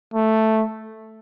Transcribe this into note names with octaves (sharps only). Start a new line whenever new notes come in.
A3